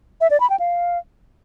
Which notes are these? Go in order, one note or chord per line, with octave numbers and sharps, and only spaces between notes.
E5
D5
B5
G5
F5